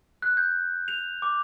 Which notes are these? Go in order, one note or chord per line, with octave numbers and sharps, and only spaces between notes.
F#6
G6
F7
D6